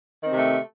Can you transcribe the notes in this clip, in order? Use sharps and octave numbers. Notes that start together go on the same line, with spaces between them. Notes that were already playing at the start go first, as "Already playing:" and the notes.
C3 D#3 A3 C4